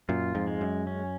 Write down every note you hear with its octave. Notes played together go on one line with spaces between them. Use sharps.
F#2 A#2 F4
F2 G#2
G#3
F#2
C#4